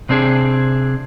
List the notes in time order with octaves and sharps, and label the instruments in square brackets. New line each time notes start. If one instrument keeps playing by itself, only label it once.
[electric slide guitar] C3 C4 D4 G#4